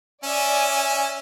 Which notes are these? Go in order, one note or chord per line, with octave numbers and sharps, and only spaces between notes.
C#4 D5 E5 G#5